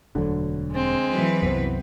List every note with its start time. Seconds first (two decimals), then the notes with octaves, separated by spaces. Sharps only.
0.15 E1 D2 D3 F#3
0.72 G#3 C4
1.10 E3 F#3 B4
1.42 C2 F#2 B3 C4